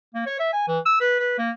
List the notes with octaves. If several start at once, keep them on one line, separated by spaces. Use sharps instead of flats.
A#3
C#5
E5
G#5
E3
E6
B4
B4
A#3